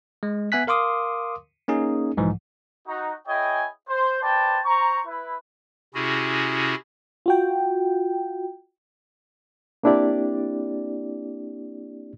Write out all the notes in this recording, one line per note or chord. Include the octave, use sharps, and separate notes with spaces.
G#3
B3 E5 G#5 F#6 B6
A#4 F5 C6 D6 D#6
A#3 C#4 D#4 G#4
B1 G#2 E3 F3
D#4 F#4
E4 G#4 C#5 D#5 G5 G#5
C5
B4 C5 D5 G5 A5
C5 A#5 C#6
E4 B4
C3 C#4 E4 F#4 G#4
F4 F#4 G5
A#3 C4 D4 E4 G4 D5